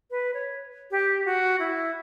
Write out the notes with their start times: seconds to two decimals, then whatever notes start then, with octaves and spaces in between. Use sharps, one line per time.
0.11 B4
0.34 C#5
0.91 G4
1.26 F#4
1.60 E4